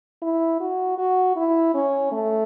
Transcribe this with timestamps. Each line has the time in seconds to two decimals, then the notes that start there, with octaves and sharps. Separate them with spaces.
0.22 E4
0.60 F#4
0.98 F#4
1.36 E4
1.74 C#4
2.12 A3